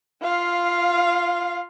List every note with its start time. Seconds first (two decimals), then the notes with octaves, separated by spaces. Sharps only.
0.23 F4 F5